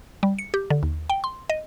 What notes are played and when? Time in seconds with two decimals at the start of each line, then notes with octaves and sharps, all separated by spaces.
0.23 G3
0.39 C#7
0.54 G4
0.70 D3
0.83 D#2
1.10 G5
1.24 C6
1.50 D#5